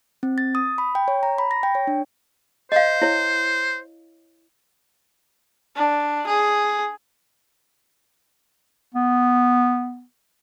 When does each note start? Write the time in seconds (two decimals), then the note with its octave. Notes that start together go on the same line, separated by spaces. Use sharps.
0.23 C4
0.38 A6
0.55 D#6
0.78 B5
0.95 G5
1.08 C#5
1.23 A#5
1.38 B5
1.51 A#6
1.63 G5
1.75 C#5
1.87 D4
2.72 C5 D#5 F5
3.02 E4 C#5
5.76 D4
6.27 G#4
8.94 B3